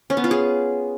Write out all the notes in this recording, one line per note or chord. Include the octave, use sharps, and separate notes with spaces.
C#4
B3
F4
G#4